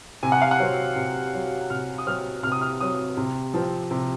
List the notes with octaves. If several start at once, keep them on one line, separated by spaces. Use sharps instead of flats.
C3 G#5
F#5
F5
F#5
F#3 C4
C3
F#3 C4
C3 F6
D#6
F#3 C4 F6
C3 F6
D#6
F6
F#3 C4 D#6
C3
F3 C4
C3